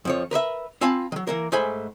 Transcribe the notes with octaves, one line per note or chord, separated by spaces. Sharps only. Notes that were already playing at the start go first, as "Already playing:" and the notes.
F2 F3 C#5
A#4 B4 D5 E5
C4 F4 F5 G#5 A5 B5
D#3 F#3
E3 A#3 A#4
G#2 A3 C5 G#5 B5